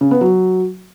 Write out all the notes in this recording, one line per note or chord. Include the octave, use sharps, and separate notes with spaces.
C#3
B3
F#3